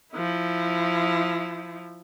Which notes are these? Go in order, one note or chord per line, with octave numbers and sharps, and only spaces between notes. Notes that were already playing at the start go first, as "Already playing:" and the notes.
F3 E4